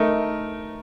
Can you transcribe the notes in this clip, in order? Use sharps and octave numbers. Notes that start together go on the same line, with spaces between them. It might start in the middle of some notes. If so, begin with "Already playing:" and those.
Already playing: A3 D#4 A#4